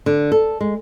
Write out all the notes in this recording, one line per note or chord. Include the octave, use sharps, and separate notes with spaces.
D3
A4
G#3